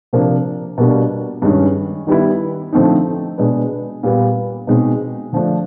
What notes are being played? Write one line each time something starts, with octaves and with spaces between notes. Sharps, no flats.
C3 F3 A#3 D4
B2 G3 A#3 D4
G2 D#3 G#3 C#4
D#3 G3 B3 E4
D3 F3 A3 C4 D#4
B2 G#3 B3 D4
A#2 G3 B3
B2 G#3 C4 D#4
D3 F3 A3 D4